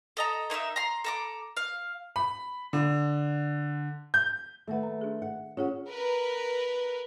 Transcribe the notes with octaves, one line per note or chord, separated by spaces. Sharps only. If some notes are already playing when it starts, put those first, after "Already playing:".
A4 D#5 A#5
A#3 D#4 E5 E6
A#5 C6
A4 A#5 D6
F5
B5
D3
G6
D#3 A3 A#3 B4 F#5
A#5
D4 G#4
F#5
C#4 F4 G#4 F#5
A#4 B4